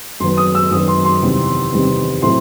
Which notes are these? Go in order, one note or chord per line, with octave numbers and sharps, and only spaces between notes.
F#2 D#3 F#3 B3 C6
D#6
E6
F#2 D#3 F#3 B3 D#6
C6
C6
E2 C3 D#3 G3 C4
E2 C3 D#3 G3 C4
A2 F#3 A3 C4 C6